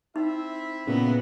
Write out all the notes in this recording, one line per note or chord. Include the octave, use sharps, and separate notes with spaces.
C4 D#4 E4 E5
A#2 C#3 B3